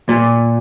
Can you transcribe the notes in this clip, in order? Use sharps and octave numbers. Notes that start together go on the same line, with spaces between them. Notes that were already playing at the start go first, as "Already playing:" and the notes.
A#2